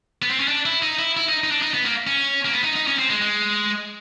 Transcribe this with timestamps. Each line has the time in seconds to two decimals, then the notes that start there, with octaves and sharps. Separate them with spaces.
0.22 B3
0.30 C4
0.40 C#4
0.48 D4
0.66 E4
0.82 D#4
0.99 E4
1.17 E4
1.28 D#4
1.44 D#4
1.51 D4
1.62 D#4
1.74 B3
1.85 A#3
2.07 C#4
2.45 A#3
2.53 B3
2.64 D#4
2.76 D#4
2.87 C#4
2.99 C4
3.10 G#3
3.22 G#3